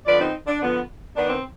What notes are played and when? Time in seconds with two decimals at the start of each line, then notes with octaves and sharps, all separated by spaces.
0.06 D3 F3 B3 B4 D5
0.19 C4 D#4
0.47 D4
0.61 D3 F3 B3
1.15 D#3 B3 D4
1.29 C4